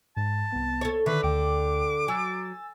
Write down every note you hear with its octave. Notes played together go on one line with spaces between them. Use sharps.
G#2 A5
C2 B3
A4 C#5
D3 D#3 B4 E5 C#6
D2 G5 D6
F#3 G#5 E6 A6